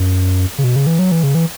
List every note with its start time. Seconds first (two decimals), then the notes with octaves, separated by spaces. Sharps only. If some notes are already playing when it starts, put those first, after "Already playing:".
Already playing: F#2
0.58 C#3
0.64 B2
0.76 C#3
0.87 E3
0.99 F#3
1.12 E3
1.23 C#3
1.35 E3